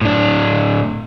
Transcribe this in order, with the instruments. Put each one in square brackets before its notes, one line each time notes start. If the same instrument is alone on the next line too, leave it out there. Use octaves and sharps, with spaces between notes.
[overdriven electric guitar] A2 D4